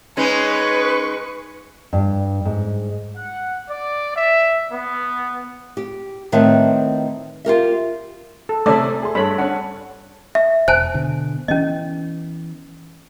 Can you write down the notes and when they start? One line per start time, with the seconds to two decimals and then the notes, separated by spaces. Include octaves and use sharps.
0.17 G#3 C#4 D#4 B4 C#6
1.93 G2
2.45 G#2
3.15 F#5
3.68 D5
4.15 E5
4.71 B3
5.77 G4
6.32 A2 D#3 C4 B4 E5 A5
7.45 F4 G4 A#4 E5
8.49 A4
8.66 C3 A3 C#4 A4 D5 E5
9.03 G#4 C6
9.15 G2 A4 C#5 B5
9.38 C#4 D4 F#5
10.35 E5
10.68 E1 C5 G#5 A5 F#6
10.94 B2 D3
11.48 E3 B3 C#4 D#5